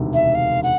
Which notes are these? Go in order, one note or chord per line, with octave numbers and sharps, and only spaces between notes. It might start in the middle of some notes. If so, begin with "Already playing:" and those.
Already playing: E1 D2 C3 D#3
E5
F5
F#5